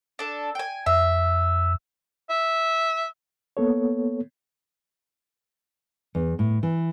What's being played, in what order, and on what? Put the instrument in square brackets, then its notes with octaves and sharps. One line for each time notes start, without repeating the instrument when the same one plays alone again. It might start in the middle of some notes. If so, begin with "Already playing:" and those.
[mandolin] D4 A4
G5 G#5
[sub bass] F2 [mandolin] E5
[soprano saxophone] E5
[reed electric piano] A#3 B3 A4 C#5
[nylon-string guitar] E2
A2
E3